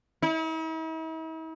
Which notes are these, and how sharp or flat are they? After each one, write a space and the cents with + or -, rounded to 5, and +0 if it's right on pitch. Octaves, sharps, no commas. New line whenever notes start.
E4 -45